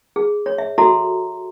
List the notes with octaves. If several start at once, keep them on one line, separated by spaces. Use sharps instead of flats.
G#4
C#5
E5
F#4 A4 E5 A#5 C6